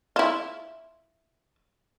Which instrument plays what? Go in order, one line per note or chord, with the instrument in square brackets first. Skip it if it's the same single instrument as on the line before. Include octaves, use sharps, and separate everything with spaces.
[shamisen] E4 F4